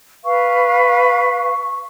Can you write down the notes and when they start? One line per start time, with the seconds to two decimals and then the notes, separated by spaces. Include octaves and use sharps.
0.25 B4 F5 C#6